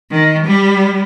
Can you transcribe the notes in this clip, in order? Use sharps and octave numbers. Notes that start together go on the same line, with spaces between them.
D#3
G3